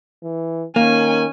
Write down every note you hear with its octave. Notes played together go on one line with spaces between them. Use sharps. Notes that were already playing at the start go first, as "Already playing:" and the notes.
E3
D#3 A#3 C#4 G#5